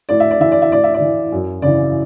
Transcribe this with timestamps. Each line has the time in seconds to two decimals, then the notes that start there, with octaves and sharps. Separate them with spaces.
0.09 A2 D5
0.20 E5
0.31 D5
0.40 E3 E5
0.52 D5
0.62 E5
0.71 A2 D5
0.84 E5
0.94 D5
1.01 E3
1.32 F#2
1.62 C#3 E3 D5